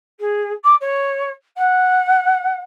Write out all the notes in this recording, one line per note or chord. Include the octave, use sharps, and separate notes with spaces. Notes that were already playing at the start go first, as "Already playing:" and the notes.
G#4
D6
C#5
F#5